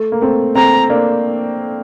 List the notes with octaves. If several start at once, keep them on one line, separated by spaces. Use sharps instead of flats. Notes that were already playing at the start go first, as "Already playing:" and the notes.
Already playing: A3
A#3
A3 C4
A3 C4 A#5
A#3 D4